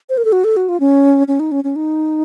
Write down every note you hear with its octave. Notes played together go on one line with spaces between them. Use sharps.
C5
A#4
A4
F#4
A4
F#4
F4
C#4
C#4
D#4
C#4
C#4
D#4